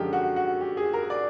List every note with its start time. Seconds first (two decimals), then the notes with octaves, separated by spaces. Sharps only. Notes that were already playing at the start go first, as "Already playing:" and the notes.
Already playing: F#2 D3 F3 G#3 G4
0.13 F#4
0.36 F#4
0.61 G4
0.77 G#4
0.93 A#4
1.10 D5